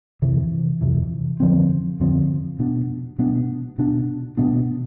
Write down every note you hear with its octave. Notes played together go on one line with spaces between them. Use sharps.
F2 C3 E3
F2 C3 E3
F2 D3 F3 C4
F2 D3 F3 C4
B2 B3 D4
B2 B3 D4
B2 B3 D4
B2 B3 D4